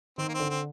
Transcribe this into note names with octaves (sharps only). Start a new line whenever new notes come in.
D#3 C4
A#3
C4
D3
C4